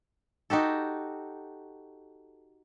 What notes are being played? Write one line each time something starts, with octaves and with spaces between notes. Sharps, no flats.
D#4 F#4 G4 A4